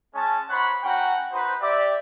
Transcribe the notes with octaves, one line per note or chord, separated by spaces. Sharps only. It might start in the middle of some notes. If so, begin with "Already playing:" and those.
G#3 C#4 A5
D#4 C5 C#5 F#5 B5
C#4 F#4 F#5 G5 A#5 B5
D#4 F#4 B4 C5
G4 D5 E5